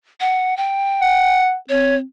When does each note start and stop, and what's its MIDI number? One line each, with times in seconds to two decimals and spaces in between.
0.21 0.57 78
0.57 1.41 79
1.01 1.55 78
1.69 2.02 60
1.69 1.96 73